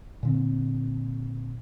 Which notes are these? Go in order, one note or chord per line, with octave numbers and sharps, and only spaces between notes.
A#2 D3 C4